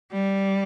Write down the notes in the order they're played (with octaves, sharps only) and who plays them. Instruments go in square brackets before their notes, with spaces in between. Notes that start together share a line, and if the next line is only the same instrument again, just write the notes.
[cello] G3